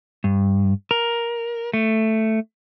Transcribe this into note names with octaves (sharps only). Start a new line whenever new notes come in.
G2
A#4
A3